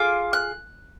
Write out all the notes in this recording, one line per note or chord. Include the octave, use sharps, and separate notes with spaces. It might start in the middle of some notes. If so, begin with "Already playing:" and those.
Already playing: F4 G#4 D6
F#6